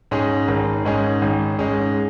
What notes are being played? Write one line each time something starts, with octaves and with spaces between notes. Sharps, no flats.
G#2 G#3 C#4 G#4
G#1
G#2 G#3 C#4 G#4
G#1
G#2 G#3 C#4 G#4